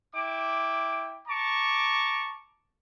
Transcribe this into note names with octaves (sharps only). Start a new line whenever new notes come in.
E4 G5 D6
A5 A#5 C#6 D6